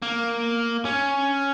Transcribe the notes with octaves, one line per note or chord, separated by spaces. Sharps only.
A#3
C#4